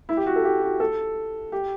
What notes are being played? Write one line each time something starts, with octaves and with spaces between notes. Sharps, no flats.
E4
G4
F#4
A4
G4
F#4
A4
G4